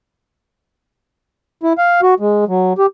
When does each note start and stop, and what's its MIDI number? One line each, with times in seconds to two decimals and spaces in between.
1.63 1.73 64
1.78 2.01 77
2.02 2.14 66
2.20 2.45 56
2.48 2.73 54
2.78 2.86 67